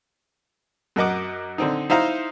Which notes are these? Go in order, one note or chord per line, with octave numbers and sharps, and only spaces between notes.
F#2 F#4 A#4 D#5 F#5 D6
D3 C4 D#4
D#4 E4 C5 F5 A#5